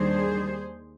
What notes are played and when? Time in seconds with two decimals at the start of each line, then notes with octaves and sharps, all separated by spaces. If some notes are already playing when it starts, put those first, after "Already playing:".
Already playing: D#2 D#3 G3 D4 G#4 C5